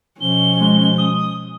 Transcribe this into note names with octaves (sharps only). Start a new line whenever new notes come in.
B2 F3 C#4 G7
G#3
D#6